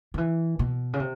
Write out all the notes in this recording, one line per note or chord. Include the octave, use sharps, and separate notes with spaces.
D#3
E3
B2
C#3
C3